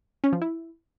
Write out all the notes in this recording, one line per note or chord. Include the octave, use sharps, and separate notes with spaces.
C#4
F3
E4